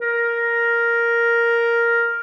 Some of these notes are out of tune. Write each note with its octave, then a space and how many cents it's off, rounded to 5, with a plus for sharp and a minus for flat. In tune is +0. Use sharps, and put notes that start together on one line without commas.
A#4 +5